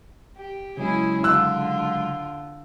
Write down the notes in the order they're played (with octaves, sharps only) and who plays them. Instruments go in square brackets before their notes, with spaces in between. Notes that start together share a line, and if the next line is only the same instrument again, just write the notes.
[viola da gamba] G4
[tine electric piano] C#3 F#3 G#3 [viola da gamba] C#4 E4 G#4
[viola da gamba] D3 F4 [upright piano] E6 F#6